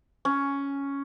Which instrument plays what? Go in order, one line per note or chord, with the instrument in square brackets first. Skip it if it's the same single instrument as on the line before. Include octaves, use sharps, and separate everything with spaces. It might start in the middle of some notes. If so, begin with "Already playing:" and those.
[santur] C#4